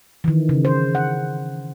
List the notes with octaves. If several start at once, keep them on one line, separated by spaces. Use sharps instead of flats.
D#3 E3
C#3
C5
F#5